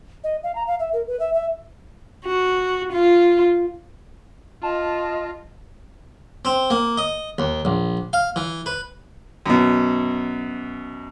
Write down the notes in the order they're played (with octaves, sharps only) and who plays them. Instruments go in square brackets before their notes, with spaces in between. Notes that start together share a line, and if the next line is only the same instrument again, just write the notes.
[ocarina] D#5
F5
A#5
F5
E5
A#4
B4
E5
E5
[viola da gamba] F#4
F4
[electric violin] F4 [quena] D#5 [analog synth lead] A5
[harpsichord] C4
A#3
D#5
D#2
A#1
F5
E3
B4
[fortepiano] F#2 B2